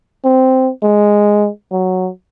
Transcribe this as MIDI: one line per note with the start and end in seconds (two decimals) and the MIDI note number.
0.24 0.71 60
0.83 1.48 56
1.72 2.10 54